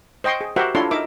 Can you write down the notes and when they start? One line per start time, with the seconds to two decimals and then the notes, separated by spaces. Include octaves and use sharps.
0.24 C5 D#5 G5 C6 C#6
0.41 G#4
0.56 F#4 G4 A#4 C5 E5 F#5
0.75 D4 E4 F4 A4 C#5 C6
0.91 D#4 A#4 E5 D6